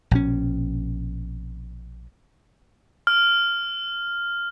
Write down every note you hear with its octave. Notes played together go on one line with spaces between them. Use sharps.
A#1 B2 C#4
F6